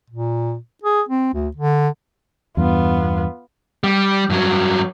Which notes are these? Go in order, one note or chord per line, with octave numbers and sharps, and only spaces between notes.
A#2
G#4
C4
D2
D3
E2 G2 B3 F4
G3
G2 F#3